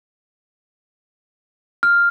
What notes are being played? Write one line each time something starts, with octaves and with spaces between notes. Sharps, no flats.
F6